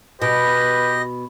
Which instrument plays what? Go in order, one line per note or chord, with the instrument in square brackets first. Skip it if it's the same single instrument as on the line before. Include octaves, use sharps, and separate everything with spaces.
[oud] B2 [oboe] G4 [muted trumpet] B4 [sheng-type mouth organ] D#5